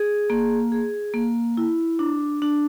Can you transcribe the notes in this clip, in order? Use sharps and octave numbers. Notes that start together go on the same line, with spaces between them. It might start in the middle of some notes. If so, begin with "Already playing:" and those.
Already playing: G#4
A#3
G#4
A#3
E4
D4
D4